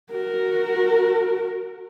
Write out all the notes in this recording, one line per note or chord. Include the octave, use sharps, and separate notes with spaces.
F#4 A#4